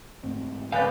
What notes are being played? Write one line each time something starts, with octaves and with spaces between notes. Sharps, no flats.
G#2 A3 C4
C#3 B3 B4 D5 F5 G#5 G6